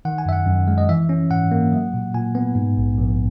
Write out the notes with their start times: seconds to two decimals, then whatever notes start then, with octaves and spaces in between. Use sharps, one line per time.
0.05 D#3 F#5
0.18 G#5
0.26 F#2 E5
0.33 F#5
0.47 F#2
0.68 G#3
0.78 D#5
0.89 E3 E5
1.09 C#4
1.30 G#2 F#5
1.52 A#3
1.72 F#3
1.94 A#2
2.14 A#2 G#5
2.35 B3
2.55 G#2
2.77 A#1
2.98 A#1